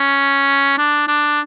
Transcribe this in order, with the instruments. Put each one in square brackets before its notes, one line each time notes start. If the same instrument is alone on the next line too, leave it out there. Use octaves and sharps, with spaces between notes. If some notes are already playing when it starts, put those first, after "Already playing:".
Already playing: [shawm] C#4
D4
D4